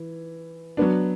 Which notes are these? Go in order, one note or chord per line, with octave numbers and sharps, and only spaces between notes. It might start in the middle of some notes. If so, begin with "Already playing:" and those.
Already playing: E3
F#3 B3 D4